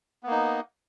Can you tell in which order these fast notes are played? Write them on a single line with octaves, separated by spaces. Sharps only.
B3 A#3 D#4